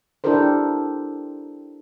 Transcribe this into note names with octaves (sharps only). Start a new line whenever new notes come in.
D4 E4 G4 A4 A#4 C5